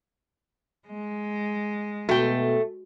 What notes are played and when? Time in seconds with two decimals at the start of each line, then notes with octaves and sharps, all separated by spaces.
0.88 G#3
2.09 B2 A3 F#4 G5